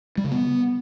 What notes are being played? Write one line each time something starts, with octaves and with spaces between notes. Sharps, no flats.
G3
C#3
B3